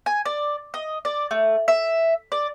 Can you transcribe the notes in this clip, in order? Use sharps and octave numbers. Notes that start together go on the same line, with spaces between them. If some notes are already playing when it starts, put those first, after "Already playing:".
G#5
D5
D#5
D5
A3
E5
D5